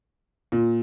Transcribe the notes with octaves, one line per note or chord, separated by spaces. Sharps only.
A#2